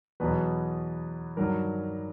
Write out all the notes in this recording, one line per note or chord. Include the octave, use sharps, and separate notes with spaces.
E2 B2 F#3 B4
G2 D#3 F#3 A#4